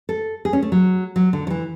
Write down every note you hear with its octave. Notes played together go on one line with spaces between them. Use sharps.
A4
G#4
C#4
A3
F#3
F#3
D3
F#3
E3